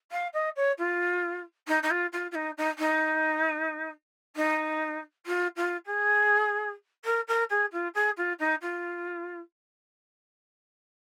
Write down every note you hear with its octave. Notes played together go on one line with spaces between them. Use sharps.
F5
D#5
C#5
F4
D#4
D#4
F4
F4
F4
D#4
D#4
D#4
D#4
F4
F4
G#4
A#4
A#4
G#4
F4
G#4
F4
D#4
F4